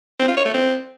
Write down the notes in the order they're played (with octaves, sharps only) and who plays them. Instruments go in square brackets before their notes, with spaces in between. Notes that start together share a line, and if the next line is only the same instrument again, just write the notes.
[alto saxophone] C4
F4
C#5
A3
C4